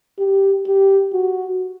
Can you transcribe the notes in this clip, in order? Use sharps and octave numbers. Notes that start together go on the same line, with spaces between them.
G4
G4
F#4